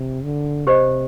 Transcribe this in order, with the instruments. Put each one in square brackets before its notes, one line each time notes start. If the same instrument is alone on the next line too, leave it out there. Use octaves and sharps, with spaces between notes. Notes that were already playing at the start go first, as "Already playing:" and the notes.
Already playing: [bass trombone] C3
D3
[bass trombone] C3 [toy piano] G4 C5 D#5